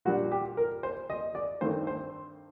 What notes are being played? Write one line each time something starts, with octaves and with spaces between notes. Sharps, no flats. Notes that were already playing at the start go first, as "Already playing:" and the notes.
A#2 G3 D4 F#4
G4
A#4
C5
D#5
D5
G2 D#3 A3 C4 C5
C5